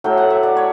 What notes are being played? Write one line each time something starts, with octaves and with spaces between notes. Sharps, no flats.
A2 F#3 A3 G5
F#5
E5
D5
C#5